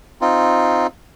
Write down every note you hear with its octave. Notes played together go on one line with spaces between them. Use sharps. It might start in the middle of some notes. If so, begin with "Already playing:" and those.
C4 D#4 F4